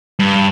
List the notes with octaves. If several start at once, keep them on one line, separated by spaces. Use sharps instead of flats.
G2